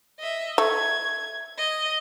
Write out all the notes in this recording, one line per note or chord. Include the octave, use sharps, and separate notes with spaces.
D#5 E5
A3 G#6
D#5